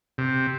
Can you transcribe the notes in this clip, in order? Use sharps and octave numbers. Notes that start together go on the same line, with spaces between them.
C3